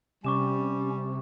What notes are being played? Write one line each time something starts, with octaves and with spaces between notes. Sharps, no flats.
C3 G3 C#4 C#6 D6 E7